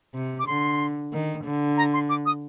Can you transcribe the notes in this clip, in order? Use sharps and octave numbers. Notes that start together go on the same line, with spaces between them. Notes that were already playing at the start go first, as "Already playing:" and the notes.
C3
D6
D3 C6
D#3
D3
A#5
C6
D6
D#6